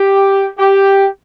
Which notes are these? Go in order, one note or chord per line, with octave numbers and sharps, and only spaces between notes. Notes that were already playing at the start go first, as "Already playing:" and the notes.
Already playing: G4
G4